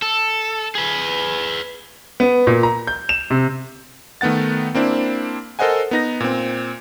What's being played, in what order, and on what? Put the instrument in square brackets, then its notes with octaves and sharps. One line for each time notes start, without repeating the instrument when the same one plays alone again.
[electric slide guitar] A4
G#4 B4
[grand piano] B3
A#2
A#5
G6
E7
C3
[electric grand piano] D#3 A3 B3 F#5 A6
A#3 C4 D4 E4
A4 A#4 C5 D#5 F#5 G#5
B3 D#4 A#6
A#2 C4